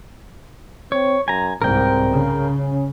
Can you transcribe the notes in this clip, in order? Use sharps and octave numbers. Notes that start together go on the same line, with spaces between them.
C4 C#5
F#2 G#5 A#5
C2 G#2 C4 A#4 G5
C#3
C#4